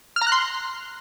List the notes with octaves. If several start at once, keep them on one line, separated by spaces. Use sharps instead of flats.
F6
A#5
F#6
C6